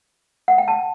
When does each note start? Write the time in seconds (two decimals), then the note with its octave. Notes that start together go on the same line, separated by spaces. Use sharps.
0.48 F#5
0.58 G5
0.68 A5